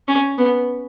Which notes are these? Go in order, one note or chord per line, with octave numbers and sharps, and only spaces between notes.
C#4
B3